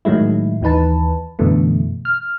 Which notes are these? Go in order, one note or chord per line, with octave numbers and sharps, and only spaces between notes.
A2 D#3 F#3 G#3 E4
D#2 E3 D#4 B4 A5
F#2 B2 D3 E3 A3
F6